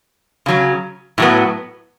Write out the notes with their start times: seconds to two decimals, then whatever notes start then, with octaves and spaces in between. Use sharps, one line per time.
0.46 C#3 F#3 C#4
1.18 A2 F#3 B3